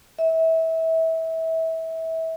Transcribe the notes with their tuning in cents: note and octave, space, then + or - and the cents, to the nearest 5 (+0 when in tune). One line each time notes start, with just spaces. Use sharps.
E5 -25